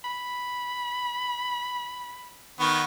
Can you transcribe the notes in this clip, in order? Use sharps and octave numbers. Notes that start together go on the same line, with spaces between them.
B5
D#3 B3 C#6